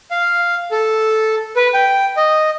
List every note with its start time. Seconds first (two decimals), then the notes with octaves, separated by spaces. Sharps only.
0.11 F5
0.71 A4
1.56 B4
1.74 G5
2.17 D#5